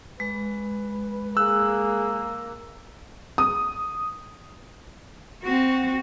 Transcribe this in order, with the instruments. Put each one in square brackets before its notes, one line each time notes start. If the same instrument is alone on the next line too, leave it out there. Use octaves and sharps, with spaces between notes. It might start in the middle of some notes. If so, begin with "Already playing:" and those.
[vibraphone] G#3 [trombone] B4
[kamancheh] A#3 [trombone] G#4 [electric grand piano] E6 F#6
[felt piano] D#6
[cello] C4 [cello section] F#4